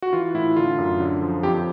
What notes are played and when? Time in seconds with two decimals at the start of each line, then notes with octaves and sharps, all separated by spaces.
0.02 F#4
0.13 E3 F4
0.34 A2 E4
0.56 D3 F4
0.78 F#2
1.00 D3
1.22 F3
1.43 F2 G4